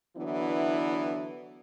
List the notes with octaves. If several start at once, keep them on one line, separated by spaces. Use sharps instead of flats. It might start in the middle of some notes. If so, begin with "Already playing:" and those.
D3 E3 F#3 B3 D4 E4